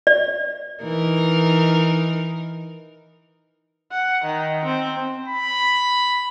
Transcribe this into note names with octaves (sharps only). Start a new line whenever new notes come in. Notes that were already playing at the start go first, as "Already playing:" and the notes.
D5
E3 D#4 A#4
F#5
D#3
C4
B5